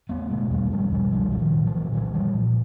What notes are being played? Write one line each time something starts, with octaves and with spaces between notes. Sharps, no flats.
E2 A3 B3
B2 G#3 A#3
E2 G3 A3
B2 F3 G3
E2 F3 G3
C2 F3 G3
A#2 F#3
D#3 F3
A#2
E3 F#3
A#2
C2 E3 F#3
A#2 F3 G3
A#2